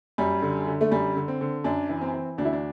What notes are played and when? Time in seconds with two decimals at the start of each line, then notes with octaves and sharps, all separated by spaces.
0.18 F#2 G3
0.42 D3
0.67 D3
0.81 A3
0.91 F#2 G3
1.16 D3
1.28 C4
1.41 D3
1.64 F#2 D4
1.89 E3
2.01 C4
2.14 E3
2.38 D2 D4
2.45 E4
2.53 D4